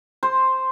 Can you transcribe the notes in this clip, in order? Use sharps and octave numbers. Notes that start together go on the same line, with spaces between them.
C5